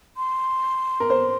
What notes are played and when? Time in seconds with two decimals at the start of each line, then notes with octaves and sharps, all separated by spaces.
0.17 C6
1.00 A#4
1.10 C5